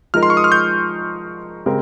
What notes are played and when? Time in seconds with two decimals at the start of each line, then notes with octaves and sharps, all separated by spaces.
0.14 F3 G#3 D#4 A#4 F6
0.23 C6
0.30 C#6
0.37 D#6
0.44 F6
0.52 G6
1.66 C#3 G#3 C4 G4 A#4